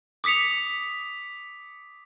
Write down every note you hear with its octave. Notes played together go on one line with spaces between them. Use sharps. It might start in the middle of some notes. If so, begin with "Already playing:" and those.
D6 D#6 B6 C#7 F7